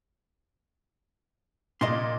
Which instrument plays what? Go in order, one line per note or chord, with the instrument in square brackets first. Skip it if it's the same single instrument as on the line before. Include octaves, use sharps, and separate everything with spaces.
[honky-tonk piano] A#2 [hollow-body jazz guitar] D#5 C6